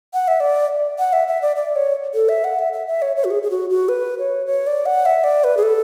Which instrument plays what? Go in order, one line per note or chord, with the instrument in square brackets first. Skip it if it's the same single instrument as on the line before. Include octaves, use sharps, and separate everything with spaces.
[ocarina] F#5
E5
D5
F#5
E5
E5
D5
D5
C#5
A4
E5
F#5
E5
E5
E5
C#5
C#5
F#4
G#4
G#4
F#4
F#4
B4
C#5
C#5
D5
F#5
E5
D5
B4
G#4
A4